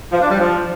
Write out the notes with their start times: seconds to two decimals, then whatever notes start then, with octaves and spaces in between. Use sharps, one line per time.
0.12 F3
0.21 D4
0.31 G3
0.40 F3